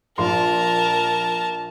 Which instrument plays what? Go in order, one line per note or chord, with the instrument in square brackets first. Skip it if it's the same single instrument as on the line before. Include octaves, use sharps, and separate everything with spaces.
[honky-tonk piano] A#1 C6 [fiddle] A#4 A5